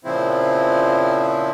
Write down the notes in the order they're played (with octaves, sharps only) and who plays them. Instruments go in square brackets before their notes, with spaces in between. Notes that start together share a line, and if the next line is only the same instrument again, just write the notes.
[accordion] A#2 C#3 F3 C4 E4